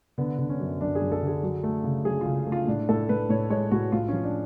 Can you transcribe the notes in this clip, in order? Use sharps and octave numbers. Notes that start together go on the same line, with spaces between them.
D3 B3
D3
C#4
F#2
F#2 D4
G#4
F#2
A4
D3
G#4
F#3
A3
C#3
F#3 G#4
C#3 F4
A3
F4
A2 D4
A2 A4
A2 B4
A2 C#5
G#3 C#5
A2 F#4
A2 F4
F3 C#4
D4